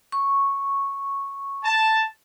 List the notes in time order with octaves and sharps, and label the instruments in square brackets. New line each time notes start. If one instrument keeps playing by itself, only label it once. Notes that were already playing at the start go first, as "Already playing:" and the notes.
[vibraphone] C#6
[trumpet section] A5